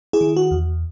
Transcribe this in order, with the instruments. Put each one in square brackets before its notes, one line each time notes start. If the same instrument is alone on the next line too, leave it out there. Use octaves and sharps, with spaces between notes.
[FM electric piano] E4 G#4
D#3
F#4
E2